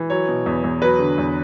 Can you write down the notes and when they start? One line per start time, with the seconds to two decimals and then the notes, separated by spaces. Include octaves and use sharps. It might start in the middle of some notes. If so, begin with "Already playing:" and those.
Already playing: E3
0.10 F#3 C#5
0.28 B2
0.46 E2
0.64 E2
0.81 F#3 B4
0.99 D3
1.18 E2